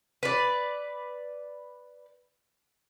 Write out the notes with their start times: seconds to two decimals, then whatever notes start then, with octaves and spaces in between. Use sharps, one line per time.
0.23 B4 D5